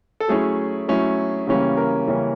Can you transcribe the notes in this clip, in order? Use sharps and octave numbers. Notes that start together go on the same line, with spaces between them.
A4
F#3 A3 C#4 E4 G#4
F#3 A3 C#4 E4
C#3 E3 G3 A#3 C#4
A#4
C#3 E3 G3 A#3 C#4